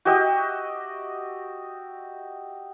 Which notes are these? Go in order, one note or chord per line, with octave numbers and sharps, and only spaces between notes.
F#4 G4 D#5 E5